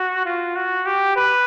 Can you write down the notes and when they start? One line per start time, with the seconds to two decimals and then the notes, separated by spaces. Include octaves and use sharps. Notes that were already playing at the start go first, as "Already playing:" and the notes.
Already playing: F#4
0.26 F4
0.55 F#4
0.86 G4
1.16 B4